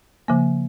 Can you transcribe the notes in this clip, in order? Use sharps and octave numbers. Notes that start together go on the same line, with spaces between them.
C#3 F3 A#3